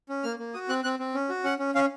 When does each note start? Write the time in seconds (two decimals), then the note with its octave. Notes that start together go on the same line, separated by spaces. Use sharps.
0.09 C#4
0.23 A#3 F6
0.39 A#3
0.54 F#4 D#6
0.69 C4 F#6
0.84 C4 F#6
0.99 C4
1.14 C#4
1.29 F#4
1.44 C#4 F#5
1.59 C#4
1.75 C#4 F5